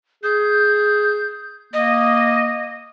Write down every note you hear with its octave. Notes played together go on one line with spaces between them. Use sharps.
G#4 G6
A#3 D#5